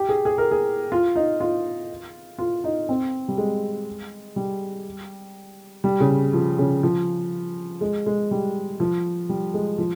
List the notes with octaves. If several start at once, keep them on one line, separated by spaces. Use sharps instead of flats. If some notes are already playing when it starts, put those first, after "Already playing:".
Already playing: G4
G#4
G#4
A#4
G#4
F4
D#4
F4
F4
D#4
C4
G3
G#3
G3
G3
C#3
F3
C#3
F3
G#3
G#3
G3
F3
G3
G#3
F3